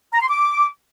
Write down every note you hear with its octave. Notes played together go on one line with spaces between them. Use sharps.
A#5
C6
D6